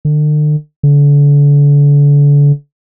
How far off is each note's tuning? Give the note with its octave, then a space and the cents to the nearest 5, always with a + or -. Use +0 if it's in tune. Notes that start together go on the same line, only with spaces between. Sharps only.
D3 +40
D3 -35